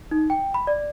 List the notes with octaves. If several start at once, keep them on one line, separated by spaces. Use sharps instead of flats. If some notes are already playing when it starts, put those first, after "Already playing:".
D#4
G5
B5
D5